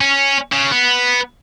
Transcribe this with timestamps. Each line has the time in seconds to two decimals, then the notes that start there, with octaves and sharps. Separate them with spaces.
0.01 C#4
0.52 C#3
0.72 B3